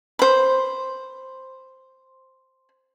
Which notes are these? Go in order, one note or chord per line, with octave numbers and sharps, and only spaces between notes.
C5 B5